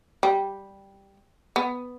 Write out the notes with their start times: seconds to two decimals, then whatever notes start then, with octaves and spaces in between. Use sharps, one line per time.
0.23 G3
1.56 B3